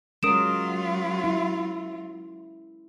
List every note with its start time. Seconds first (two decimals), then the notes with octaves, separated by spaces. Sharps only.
0.23 F#3 G#3 C#4 F4 A#4 D#6 D7 E7
1.24 E4